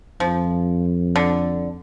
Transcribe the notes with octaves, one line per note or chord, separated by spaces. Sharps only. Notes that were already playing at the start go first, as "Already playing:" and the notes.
F2 F3
D3